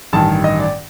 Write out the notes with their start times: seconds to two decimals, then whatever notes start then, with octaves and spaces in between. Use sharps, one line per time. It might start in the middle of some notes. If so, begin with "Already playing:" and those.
0.13 A1 G2 D#3 A5
0.44 D#5
0.60 D5